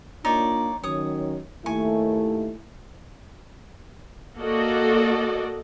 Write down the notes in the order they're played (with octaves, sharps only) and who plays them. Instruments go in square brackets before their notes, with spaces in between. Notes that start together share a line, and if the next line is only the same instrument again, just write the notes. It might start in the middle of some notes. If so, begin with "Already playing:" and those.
[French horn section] A#3 D4 F4 [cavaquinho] D#4 C#5 D5
[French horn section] D#3 F#3 C#4 [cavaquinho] C#5 D#6
[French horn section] D#2 A3 E4 [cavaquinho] G#5 C#6
[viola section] A#3 F#4 A4 D5 D#5